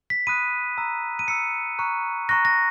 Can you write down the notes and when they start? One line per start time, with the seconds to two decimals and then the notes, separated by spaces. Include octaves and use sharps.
0.10 B6
0.27 B5 D#6 F#6 D#7
0.78 A#5 E6
1.19 D#7
1.28 A#5 E6 C#7
1.79 A#5 C#6 F#6
2.29 A#5 C#6 F#6 A#6
2.45 A#6